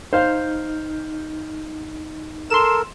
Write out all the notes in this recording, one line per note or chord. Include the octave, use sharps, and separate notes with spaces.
D#4 C5 F5 F6 G6
A4 A#4 C6 E7